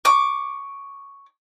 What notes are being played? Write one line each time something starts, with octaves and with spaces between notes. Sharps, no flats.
C#6 D6